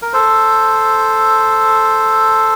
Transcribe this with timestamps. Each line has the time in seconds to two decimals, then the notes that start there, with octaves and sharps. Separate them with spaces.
0.02 A#4
0.13 A4 C5